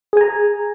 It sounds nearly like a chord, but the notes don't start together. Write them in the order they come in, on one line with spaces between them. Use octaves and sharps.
G#4 G#5 A#5